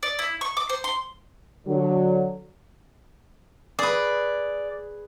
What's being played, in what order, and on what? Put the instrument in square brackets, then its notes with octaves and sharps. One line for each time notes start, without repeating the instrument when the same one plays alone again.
[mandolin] D5
E4
C#6
D6
C5
C6
[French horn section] D3 F#3
[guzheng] G#4 B4 [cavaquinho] D5